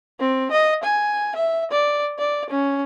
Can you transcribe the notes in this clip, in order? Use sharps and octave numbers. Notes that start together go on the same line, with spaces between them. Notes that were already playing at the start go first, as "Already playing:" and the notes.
C4
D#5
G#5
E5
D5
D5
C#4